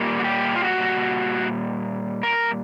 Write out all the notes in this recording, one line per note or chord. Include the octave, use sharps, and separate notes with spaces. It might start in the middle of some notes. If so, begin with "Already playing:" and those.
Already playing: A#2 G3 A#3
F#4
G4
F4
F#4
A#4